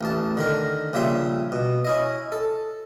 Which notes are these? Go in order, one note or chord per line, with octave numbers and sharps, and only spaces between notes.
A1 E2 A5
D3 D#3 A#4
A#1 C#3 G3 E5 C6
B2
C#4 E4 D#5
A4